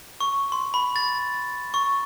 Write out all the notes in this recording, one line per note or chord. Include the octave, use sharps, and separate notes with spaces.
C#6
C6
B5
A6
C#6